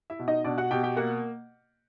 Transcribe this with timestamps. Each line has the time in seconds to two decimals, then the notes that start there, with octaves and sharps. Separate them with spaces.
0.10 E4 E5
0.19 B2
0.28 D#4 D#5
0.44 B2 D4 D5
0.58 F#4 F#5
0.71 B2 G4 G5
0.83 G4 G5
0.96 A#3 F#4 F#5